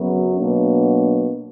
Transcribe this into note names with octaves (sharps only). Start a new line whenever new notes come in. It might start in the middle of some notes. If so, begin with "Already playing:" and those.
Already playing: F#2 C#3 F#3 B3
B2 F#3 A#3 D4